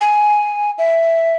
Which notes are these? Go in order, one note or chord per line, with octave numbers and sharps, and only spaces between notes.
G#5
E5